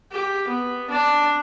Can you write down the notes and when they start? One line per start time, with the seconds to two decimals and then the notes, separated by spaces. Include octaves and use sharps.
0.12 G4
0.48 B3
0.90 D4